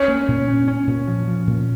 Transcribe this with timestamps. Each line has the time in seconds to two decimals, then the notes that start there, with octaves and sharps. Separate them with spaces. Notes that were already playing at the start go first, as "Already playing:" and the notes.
Already playing: C#4
0.08 A#3
0.28 A#2
0.48 C#4
0.68 C#4
0.87 A#2
1.07 F3
1.27 F3
1.47 A#2